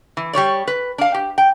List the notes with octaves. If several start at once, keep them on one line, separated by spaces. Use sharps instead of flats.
E3
G3 G#4 C#5 D5
B4
D4 F5
G4
G5